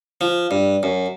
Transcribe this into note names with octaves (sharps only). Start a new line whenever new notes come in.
F3
G2
F#2